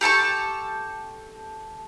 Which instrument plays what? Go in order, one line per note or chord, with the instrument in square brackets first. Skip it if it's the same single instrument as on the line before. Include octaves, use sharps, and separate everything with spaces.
[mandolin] G4 A4 A5 C#6